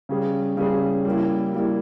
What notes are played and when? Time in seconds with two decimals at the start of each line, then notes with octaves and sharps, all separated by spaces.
0.09 C#3 G3 C#4 G#4
0.57 C#3 G3 C#4 G#4
1.05 G3 A#3 E4
1.53 G3 A#3 E4